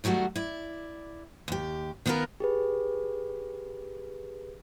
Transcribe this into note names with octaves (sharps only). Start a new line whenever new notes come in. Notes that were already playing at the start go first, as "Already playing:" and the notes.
D#3 F#3 G3 A3 F#4
E4 D5
D#2 G4
D#3 B3 F4 F#4 A#4 B4
G4 G#4 B4